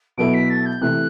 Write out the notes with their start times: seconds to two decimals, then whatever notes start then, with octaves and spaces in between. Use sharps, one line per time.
0.18 B2 F#3 B3 E4 A4 D7
0.34 B6
0.50 A6
0.66 G6
0.82 C3 E3 A3 F#6